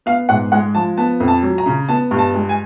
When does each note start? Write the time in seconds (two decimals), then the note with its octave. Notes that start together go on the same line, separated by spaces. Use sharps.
0.06 B3 F5
0.29 G#2 F#5
0.52 G#3 F#5
0.75 F3 A5
0.97 B3 A5
1.20 F2
1.28 A5
1.43 F#3
1.58 A#5
1.66 C#3
1.89 B3 A5
2.11 G2
2.19 A5
2.34 G#3
2.49 G#5